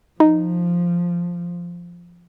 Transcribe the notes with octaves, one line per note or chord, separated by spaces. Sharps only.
F3 D#4